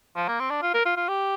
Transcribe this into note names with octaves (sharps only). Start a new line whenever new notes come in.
F3
A#3
C4
D4
F4
A#4
F4
F4
G4